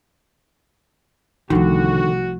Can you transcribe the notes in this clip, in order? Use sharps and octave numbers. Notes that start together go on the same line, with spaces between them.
C2 D3 D#3 F3 A3 F#4